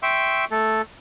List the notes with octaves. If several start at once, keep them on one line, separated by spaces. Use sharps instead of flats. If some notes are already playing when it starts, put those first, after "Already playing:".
E5 G5 C6 C#6 E6
A3 A4